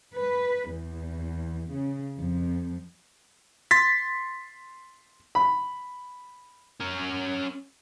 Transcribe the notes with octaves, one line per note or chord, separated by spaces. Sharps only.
B4
E2
C#3
F2
C6 A6 B6
B5
C#4 A#4